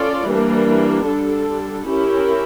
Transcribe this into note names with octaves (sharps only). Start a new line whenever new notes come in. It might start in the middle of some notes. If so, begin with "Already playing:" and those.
Already playing: C#4 F4 A4 D5
E3 G3 A#3 D4
D3 G3 D4 A4
C#4 E4 G4 A#4